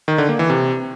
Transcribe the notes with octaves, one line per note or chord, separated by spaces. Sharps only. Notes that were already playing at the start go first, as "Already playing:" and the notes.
D#3
D3
A#3
E3
C3